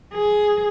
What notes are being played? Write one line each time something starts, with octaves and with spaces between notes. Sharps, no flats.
G#4